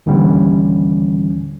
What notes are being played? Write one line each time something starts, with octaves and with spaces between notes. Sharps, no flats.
D#2 A#2 D3 E3 G3 C#4